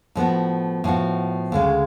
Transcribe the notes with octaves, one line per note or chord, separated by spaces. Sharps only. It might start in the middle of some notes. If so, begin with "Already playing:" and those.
A2 F3 B3 F#4
A2 F3 B3 F#4
D2 C#3 G#3